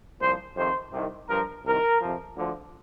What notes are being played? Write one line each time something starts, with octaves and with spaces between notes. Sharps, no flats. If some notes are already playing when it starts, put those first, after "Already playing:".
C2 A#2 F3 C5
F2 C3 D#3 C5
C2 C3 D#3
G2 F3 A#4
C2 C3 D#3 A#4
F2 C3 F3
D2 D3 F3